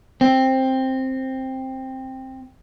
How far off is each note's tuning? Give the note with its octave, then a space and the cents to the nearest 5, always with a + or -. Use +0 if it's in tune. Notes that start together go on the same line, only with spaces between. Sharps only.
C4 +10